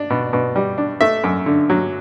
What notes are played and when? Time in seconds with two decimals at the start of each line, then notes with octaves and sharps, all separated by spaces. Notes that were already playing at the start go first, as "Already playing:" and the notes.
Already playing: D4
0.10 B2
0.33 B2
0.56 G3
0.78 D4
1.01 A3 E5
1.24 F#2
1.46 D3
1.70 F#3